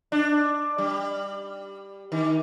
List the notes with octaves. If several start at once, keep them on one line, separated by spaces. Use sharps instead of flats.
D4
G3
D#3